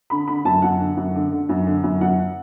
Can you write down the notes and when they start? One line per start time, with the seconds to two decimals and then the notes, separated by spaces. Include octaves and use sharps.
0.10 D3 B5
0.28 D3 B5
0.45 F#2 A5
0.62 F#2 F#5
0.80 D3
0.97 F#2
1.15 D3
1.32 D3
1.49 F#2
1.67 D3
1.83 F#2
2.01 F#2 F#5